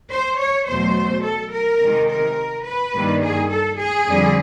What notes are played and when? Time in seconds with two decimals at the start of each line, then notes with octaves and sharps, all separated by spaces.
0.11 C5
0.39 C#5
0.67 E2 B2 F#3 A3 C5
1.23 A4
1.52 A#4
1.80 C3 D#3 G#3
2.09 A#4
2.65 B4
2.93 G2 D#3 G3 A#3
3.22 G#4
3.50 A4
3.78 G#4
4.06 F2 D3 G3